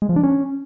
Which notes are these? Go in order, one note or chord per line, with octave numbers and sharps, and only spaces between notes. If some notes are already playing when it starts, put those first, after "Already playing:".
G#3
F3
D4
C#4